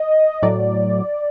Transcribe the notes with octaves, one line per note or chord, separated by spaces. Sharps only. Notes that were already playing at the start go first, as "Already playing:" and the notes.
Already playing: D#5
A2 F#3 D5